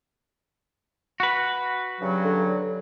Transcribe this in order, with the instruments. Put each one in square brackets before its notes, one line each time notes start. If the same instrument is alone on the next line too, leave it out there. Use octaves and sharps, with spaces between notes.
[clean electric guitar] F#4 B4
[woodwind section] G2 C#3 F#3
[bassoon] D3